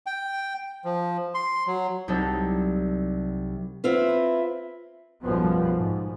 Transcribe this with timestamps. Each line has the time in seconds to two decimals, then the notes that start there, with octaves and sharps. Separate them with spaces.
0.06 G5
0.85 F3
1.34 C6
1.67 F#3
2.08 C2 C3 F#3 D#4 A4
3.84 C4 E4 F4 B4
5.23 B1 F#2 F3 G3 B3
5.75 G#2